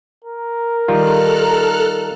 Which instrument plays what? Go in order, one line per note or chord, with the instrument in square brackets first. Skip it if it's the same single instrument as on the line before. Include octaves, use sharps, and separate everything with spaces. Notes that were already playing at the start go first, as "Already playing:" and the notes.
[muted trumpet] A#4
[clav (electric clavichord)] D#3 G3 F4 [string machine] A4 F6 F#6